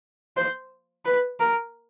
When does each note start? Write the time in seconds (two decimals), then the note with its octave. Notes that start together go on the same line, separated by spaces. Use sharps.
0.37 C5
1.05 B4
1.40 A#4